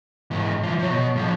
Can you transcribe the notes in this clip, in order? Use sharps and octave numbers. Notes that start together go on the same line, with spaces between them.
G#2 E3
E3 F3
F3 C#5
B2
A2 F3